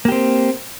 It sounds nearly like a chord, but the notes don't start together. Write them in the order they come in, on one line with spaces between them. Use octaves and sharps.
A#3 G4 C4